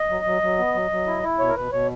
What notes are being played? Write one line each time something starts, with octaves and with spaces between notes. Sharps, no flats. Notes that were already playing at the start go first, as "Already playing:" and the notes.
Already playing: D#5
F#3
F#3
F#3
B3
F#3
F#3
E4
E4
B2 C#5
A#4
B2 B4
B2 C#5